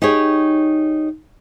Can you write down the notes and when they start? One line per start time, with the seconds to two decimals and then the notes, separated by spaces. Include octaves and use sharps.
0.02 D#4 G4 G#4 C#5